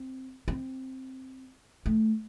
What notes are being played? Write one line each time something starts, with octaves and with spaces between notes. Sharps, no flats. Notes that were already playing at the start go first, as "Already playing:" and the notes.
Already playing: C4
C4
A3